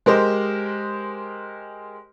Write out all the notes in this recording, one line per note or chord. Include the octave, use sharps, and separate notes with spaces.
G#3 G4 A#4 C5 D#5